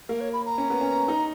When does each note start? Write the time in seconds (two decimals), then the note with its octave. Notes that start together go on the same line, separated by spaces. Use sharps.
0.09 A#3 A#4
0.21 C#5
0.33 B5
0.46 A#5
0.58 C#4
0.70 B3
0.81 C#4
1.08 D#4